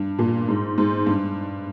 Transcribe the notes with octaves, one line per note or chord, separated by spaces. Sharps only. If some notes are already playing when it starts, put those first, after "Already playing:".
Already playing: G2
A#2
G#2
G#2
G2